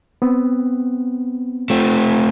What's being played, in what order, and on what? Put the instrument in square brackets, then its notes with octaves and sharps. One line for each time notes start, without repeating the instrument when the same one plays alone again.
[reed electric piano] B3 C4
[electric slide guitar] A3 C4 [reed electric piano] F4